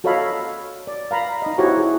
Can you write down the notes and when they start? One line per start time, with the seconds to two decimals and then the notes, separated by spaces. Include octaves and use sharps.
0.04 F#4 A4 C#5 D#5 F5 B5
0.87 D5
1.11 F5 A#5 B5
1.42 D#4 D#5
1.58 E4 F#4 G4 C5 C#5 A5
1.77 E4 G#4